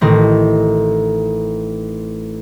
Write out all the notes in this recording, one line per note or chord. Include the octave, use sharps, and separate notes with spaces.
A1 D#3 C4 A#6